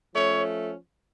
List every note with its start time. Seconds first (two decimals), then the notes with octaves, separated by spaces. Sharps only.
0.13 F3 A3 C#4 C#5